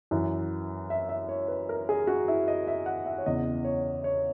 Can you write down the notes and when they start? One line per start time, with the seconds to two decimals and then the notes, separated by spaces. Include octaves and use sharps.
0.11 F#2 E3
0.90 E5
1.09 E5
1.29 C#5
1.48 B4
1.69 A#4
1.89 G#4
2.07 F#4
2.28 E4
2.48 D#5
2.67 E5
2.86 F#5
3.06 E5
3.18 C#5
3.25 E2 C#3 E3 D#5
3.65 C#5
4.04 C#5